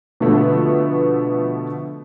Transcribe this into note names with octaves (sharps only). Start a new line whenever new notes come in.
B2 D3 F3 A3 B3